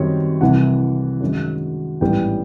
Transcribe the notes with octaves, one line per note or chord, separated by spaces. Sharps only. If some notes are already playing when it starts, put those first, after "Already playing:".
Already playing: F#2 D#3 G3 C4 C#5
C2 C3 E3 F#5
F#2 D#3 G#3 C#4
A1 G#2 E3 G3 B3 G5